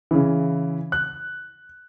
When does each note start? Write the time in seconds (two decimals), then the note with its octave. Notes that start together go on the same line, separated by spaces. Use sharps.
0.11 C#3 E3
0.92 F#6